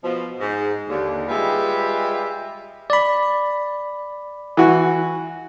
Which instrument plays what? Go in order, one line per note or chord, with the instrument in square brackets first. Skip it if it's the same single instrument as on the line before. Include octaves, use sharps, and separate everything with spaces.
[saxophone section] B2 F3
G#2
D#2 D3
G3 G#3 F4 G4 B4 E5
[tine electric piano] D5 B5
[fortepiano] E3 F#4